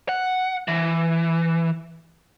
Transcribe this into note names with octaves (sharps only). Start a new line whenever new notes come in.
F#5
E3